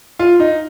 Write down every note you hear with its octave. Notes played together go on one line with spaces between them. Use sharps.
F4
D#4